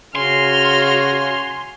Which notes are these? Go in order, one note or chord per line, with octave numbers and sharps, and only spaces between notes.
C#3 F#4 G#5 C6 F6